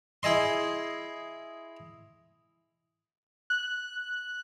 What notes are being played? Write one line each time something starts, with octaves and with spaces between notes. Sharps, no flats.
E4 G#4 D#5 C6
F#6